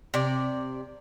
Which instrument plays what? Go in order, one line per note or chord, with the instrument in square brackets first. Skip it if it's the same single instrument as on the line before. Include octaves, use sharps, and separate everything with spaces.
[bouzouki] C3 D5